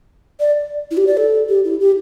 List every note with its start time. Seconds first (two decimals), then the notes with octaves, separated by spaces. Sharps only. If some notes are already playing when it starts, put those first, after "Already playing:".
0.40 D5
0.91 E4
0.97 G4
1.07 D5
1.17 A4
1.49 G4
1.64 E4
1.80 G4